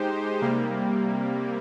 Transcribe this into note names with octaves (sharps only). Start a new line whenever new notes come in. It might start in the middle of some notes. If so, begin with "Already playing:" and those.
Already playing: G#3 D#4 G4 C5
C3 G3 A#3